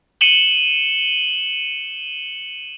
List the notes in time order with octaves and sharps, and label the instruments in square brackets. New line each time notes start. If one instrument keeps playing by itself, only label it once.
[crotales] C#7 D#7 E7 F#7 G7